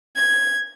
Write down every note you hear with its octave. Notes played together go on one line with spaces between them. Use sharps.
G#6